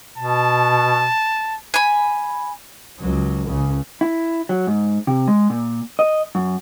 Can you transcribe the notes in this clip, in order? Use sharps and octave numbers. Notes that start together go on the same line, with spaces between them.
B2 A5
G#5 B5
C#2 F#3
C#2 C#3
E4
F#3
G#2
C3
G#3
A#2
D#5
F#2